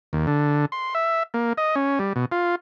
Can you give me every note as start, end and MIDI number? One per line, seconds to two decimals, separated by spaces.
0.13 0.26 39
0.27 0.66 50
0.72 0.94 84
0.95 1.23 76
1.34 1.53 58
1.58 1.75 75
1.76 1.99 61
1.99 2.13 55
2.16 2.25 47
2.32 2.55 65